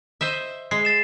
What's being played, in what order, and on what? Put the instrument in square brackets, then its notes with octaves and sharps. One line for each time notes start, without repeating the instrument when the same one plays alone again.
[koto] C5 D#5 E5
[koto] G#3 [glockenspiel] C7
[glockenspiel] A6 E7